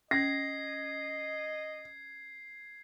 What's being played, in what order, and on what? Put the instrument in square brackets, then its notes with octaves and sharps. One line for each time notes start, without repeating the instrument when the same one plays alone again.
[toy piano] C#4 [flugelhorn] D#5 [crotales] G#6 C7 [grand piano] A#6